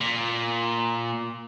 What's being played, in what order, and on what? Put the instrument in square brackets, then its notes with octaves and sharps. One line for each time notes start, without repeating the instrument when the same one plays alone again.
[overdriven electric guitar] A#2